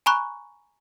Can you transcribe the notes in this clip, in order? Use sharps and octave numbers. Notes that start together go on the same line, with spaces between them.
G#5 A#5 B5 C#6 F#6